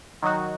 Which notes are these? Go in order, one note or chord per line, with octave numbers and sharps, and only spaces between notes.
D#3 F#3 D#4 F#4